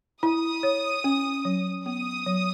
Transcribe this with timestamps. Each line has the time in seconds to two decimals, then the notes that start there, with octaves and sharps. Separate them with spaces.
0.22 E4 D#6
0.63 C#5
1.04 C#4
1.45 F#3
1.86 B3 D#6
2.27 F#3